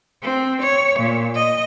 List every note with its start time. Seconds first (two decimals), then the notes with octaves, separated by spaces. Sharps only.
0.22 C4
0.61 C#5
0.99 A#2
1.34 D#5